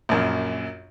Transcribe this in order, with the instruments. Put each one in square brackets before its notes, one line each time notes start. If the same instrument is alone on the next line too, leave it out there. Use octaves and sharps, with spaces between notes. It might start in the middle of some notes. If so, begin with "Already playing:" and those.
[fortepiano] A#1 F#2